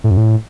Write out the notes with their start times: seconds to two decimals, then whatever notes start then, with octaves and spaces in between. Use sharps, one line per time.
0.04 A2
0.11 F#2
0.17 A2